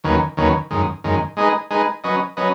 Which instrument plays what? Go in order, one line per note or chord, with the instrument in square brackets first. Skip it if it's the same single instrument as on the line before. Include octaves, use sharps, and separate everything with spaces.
[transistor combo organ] D#2 D#3 F#3 C#4 B4
D#2 D#3 F#3 C#4 B4
F#2 D#3 G#3
F#2 D#3 G#3
G#3 D#4 G#4 B4
G#3 D#4 G#4 B4
F#3 C#4 B4 D#5
F#3 C#4 B4 D#5